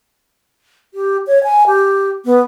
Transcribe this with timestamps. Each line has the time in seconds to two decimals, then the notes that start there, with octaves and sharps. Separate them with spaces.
0.94 G4
1.27 C#5
1.44 G#5
1.67 G4
2.25 B3